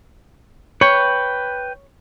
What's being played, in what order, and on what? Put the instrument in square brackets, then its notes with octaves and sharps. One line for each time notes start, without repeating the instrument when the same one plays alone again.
[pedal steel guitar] B4 G5 [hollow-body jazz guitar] C#5